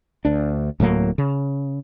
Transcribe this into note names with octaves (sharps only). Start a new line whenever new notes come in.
D2 D4
D1 A2 F#3 A#3
C#3